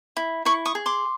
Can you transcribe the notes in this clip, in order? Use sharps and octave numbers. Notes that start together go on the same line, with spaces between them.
E4
E4 B5 C#6
C#6 D#6
G#4
C6 D6